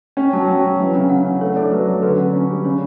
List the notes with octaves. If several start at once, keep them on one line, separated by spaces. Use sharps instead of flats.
C#4 G5
F#3 A5
F#3 G5
F#3
E3
C#3
C#3 F#5
C#4
A3 C#5
D4 A4
F#3 B4
F#3
D3 B4
C#4
C#4
G3
C#3 C#5